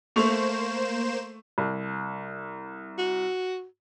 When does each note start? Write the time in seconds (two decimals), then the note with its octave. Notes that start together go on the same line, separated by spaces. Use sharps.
0.16 A3 A#3 C5 C#6 E7 F7
1.58 C2
2.98 F#4